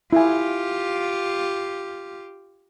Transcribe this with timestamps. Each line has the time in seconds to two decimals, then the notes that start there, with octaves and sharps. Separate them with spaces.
0.13 E4 F4 G4 G#5